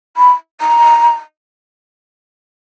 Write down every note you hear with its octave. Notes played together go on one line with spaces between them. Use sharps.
B5
A#5